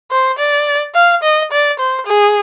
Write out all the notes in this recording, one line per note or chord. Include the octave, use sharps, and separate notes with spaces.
C5
D5
F5
D#5
D5
C5
G#4